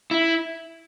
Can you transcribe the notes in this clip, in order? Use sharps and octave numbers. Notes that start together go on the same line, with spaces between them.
E4